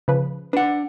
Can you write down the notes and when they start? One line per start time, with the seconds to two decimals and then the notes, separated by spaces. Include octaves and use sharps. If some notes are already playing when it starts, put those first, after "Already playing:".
0.08 C#3 F3 B4
0.53 D4 B4 F#5